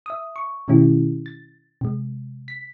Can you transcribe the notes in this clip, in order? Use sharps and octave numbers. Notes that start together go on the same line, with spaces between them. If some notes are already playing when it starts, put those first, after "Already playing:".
E5 D#6
C#6
B2 D#3 A3 C#4 E4 G4
A6
C3 G#3
B6